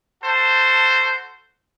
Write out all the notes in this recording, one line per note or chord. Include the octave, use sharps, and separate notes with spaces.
F#4 A4 C5 A5